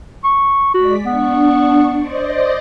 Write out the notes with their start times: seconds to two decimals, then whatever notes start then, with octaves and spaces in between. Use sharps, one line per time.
0.24 C#6
0.74 G#3 F#4 D5 B6
1.06 B3 D4 C#6
1.96 C5 D5 D#5